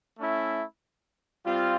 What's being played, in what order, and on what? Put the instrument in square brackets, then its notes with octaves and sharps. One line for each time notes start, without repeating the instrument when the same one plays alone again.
[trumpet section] A3 C#4 E4
G3 C4 F4